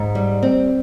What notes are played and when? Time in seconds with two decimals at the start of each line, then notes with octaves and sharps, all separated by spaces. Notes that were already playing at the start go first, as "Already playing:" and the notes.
Already playing: G#2
0.15 G3
0.43 C4